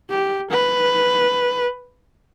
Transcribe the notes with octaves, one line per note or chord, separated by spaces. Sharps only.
G4
B4